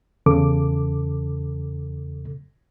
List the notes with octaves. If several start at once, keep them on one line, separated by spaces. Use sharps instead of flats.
E2 C#3 A4 D6